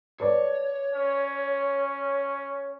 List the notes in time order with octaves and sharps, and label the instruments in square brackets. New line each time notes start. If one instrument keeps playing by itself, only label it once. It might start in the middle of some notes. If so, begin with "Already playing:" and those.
[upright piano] A4 B4 D5 [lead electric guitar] C#5
[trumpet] C#4